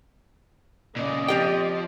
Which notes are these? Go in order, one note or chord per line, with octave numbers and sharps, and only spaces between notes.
A#2 C#3 D5 D#5
F3 C4 G4 G5